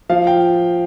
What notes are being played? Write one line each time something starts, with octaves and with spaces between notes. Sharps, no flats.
F3 F5
G5